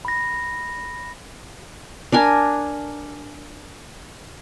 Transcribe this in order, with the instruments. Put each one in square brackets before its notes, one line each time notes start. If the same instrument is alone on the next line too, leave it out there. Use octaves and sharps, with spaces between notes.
[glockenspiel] B5 A#6
[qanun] D4 A#4 G#5